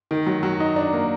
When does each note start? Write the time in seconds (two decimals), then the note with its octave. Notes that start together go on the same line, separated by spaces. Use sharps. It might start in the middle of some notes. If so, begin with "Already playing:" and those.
0.11 D#3
0.27 F#3
0.43 F#3
0.60 D#4
0.76 D4
0.93 A#3